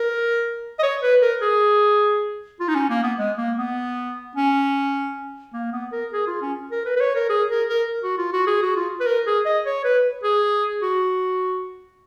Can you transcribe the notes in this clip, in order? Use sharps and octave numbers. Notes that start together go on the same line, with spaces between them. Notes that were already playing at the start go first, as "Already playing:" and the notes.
Already playing: A#4
D#5
C#5
B4
A#4
G#4
F4
D#4
C#4
A#3
B3
G#3
A#3
B3
C#4
A#3
B3
A#4
G#4
F4
C#4
A#4
B4
B4
C#5
A#4
G#4
A#4
A#4
F#4
F4
F#4
G#4
F#4
F4
B4
A#4
G#4
D#5
C#5
B4
G#4
F#4